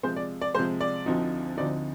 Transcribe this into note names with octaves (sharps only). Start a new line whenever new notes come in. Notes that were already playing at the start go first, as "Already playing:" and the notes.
C3 F3 G#3 C5
D5
D5
C3 F3 G#3 C5
D5
D2 D3 F3 C4 D#4
D2 D3 F3 C4 D#4 D5